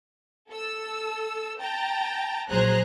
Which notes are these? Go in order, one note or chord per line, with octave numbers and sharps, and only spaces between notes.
A4 E6
G5 A5 A#5
A#1 F#3 G#4 C5 A#5 F#6